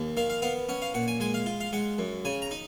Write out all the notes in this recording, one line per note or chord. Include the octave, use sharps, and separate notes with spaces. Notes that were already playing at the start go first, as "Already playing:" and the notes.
Already playing: D#2
D#3 F5
F5
B3 F5
C#4 F#5
F5
A#2 F#5
G#5
G#3 G#5
F5
F4
F5
G#3 F#5
F#2
C#3 G#5
A#5
D#4